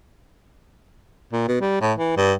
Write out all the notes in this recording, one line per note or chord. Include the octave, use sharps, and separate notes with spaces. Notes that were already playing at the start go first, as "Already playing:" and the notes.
A#2
B2
G3
A2
E3
G2